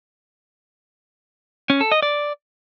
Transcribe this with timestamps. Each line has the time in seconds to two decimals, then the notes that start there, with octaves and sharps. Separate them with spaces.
1.70 C#4
1.81 A4
1.92 D#5
2.02 D5